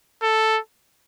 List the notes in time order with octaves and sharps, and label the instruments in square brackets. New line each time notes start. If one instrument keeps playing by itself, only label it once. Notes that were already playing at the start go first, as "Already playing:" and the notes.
[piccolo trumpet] A4